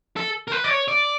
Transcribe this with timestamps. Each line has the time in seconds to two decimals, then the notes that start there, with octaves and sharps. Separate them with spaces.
0.16 A4
0.48 A#4
0.52 B4
0.64 D5
0.70 C#5
0.88 D5